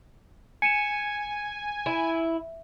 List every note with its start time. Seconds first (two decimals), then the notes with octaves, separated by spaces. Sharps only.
0.62 G#5 C#7 D#7 E7
1.86 E4